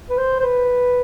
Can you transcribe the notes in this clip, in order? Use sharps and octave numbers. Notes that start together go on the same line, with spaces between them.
B4
C5
C5
B4